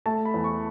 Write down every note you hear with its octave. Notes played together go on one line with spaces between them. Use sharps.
A3 A5
B5
E2
C#6